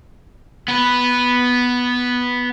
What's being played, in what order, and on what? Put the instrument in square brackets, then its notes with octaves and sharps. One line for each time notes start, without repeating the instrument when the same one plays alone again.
[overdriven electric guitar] B3 B4